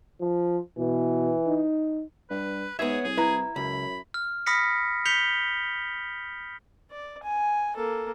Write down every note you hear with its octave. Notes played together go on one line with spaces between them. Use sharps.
F3
B2 E3
D#4
G2 B4
G#2 B3 G#4 C#5 E5
C2 G#4
E4 B4 A#5
C#2 F#2 B5
F6
B5 D#6 F6 A#6 B6 C#7
G6 B6 C#7 F7 G7
D5
G#5
A#3 A4